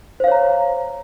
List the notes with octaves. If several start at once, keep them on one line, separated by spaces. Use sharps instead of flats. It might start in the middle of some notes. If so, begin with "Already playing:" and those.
C5 C#5 F5 A#5